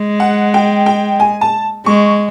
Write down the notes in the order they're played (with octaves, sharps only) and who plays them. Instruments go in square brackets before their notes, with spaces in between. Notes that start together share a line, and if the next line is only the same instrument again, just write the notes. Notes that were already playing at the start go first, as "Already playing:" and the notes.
Already playing: [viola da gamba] G#3
[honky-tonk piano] F#5
G5
G5
G#5
A5
[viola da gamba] G#3 [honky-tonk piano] C#6